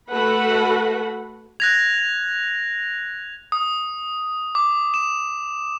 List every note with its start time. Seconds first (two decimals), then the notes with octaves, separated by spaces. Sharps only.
0.10 A3 F#4 A4 B4 F#5 B5
1.60 F#6 G#6 A#6 F7
3.52 D#6
4.55 D6
4.94 E7